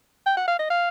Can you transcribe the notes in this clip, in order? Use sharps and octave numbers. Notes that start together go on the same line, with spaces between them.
G5
F#5
F5
D#5
F5